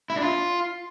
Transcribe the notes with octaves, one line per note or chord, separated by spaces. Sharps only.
E4
D4
F4